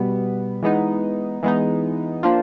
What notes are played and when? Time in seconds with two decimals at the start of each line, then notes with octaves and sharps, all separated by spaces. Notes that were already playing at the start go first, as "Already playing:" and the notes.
Already playing: B2 G3 B3
0.63 E3 G#3 B3 D#4
1.43 E3 G#3 B3 D#4
2.23 F3 A#3 D4 F4